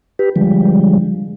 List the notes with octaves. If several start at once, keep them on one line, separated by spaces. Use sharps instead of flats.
G4 B4
D3 F3 G3 G#3